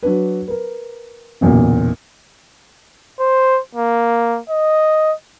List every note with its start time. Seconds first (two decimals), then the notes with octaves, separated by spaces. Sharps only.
0.03 F#3 D4 B4
0.48 A#4 B4
1.41 F#1 B1 E2 A#2
3.20 C5
3.75 A#3
4.50 D#5